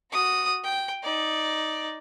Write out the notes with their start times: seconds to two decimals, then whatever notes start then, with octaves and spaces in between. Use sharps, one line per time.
0.11 F#4 D#6
0.64 G5
1.03 D#4 D5